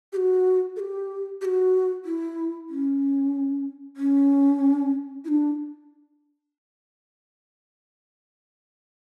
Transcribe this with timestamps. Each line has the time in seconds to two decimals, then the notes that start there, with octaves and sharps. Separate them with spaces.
0.13 G4
0.17 F#4
0.76 A4
0.80 G4
1.41 G4
1.45 F#4
2.05 E4
2.69 C#4
3.97 C#4
5.25 E4
5.28 D4